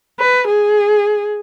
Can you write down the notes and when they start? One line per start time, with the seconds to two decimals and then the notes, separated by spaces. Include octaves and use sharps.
0.19 B4
0.47 G#4